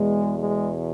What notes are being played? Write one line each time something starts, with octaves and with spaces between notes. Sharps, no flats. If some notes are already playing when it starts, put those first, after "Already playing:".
Already playing: E2 B2 G#3
G#3